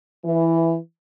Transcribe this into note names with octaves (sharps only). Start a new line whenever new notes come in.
E3